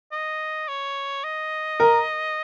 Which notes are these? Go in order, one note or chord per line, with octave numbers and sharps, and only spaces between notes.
D#5
C#5
D#5
A#4